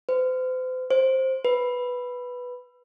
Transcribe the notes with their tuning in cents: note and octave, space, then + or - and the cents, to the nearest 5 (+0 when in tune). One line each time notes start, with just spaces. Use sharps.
C5 -40
C5 +10
B4 +0